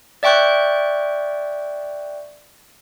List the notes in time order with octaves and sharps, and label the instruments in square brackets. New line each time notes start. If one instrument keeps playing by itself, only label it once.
[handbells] D5 E5 G5 C#6 F#6 G6